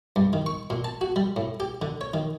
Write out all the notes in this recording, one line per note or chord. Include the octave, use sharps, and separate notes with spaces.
G2
D#3
C#6
A#2
A5
F#4
G3
A2
G4
D3
C#5
D#3